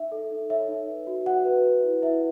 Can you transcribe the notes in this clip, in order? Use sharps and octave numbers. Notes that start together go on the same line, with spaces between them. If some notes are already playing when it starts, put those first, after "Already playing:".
Already playing: D#4 E5
A4
D#4
C#5 E5
D#4
B4
F#4
F#4 F#5
B4
B4
E4
E4 E5